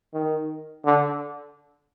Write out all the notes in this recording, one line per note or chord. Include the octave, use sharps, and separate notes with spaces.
D#3
D3